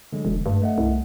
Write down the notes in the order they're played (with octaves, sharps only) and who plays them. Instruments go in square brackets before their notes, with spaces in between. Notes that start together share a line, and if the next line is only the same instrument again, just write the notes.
[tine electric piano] D3 F#3 G#3
[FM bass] E1
[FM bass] G2 [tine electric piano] A3
[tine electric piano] A3 D#5 F#5
[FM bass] C2